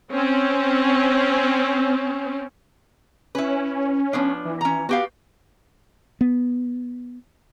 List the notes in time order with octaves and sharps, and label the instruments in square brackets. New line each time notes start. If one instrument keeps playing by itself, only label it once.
[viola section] C4 C#4
[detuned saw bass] C#4 [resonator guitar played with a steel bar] E4 B4
[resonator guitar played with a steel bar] F3 B3 D4
[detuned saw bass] E3
[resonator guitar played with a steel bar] C#4 A#5
[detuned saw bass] B3 [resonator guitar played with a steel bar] F#4 G4 F5
[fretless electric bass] B3